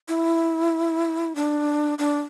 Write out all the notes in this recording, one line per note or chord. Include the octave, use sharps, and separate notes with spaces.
E4
D4
D4